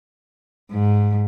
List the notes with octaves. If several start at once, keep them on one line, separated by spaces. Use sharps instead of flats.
G#2